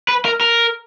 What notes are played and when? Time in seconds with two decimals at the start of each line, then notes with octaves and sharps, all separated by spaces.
0.08 B4
0.25 A#4
0.41 A#4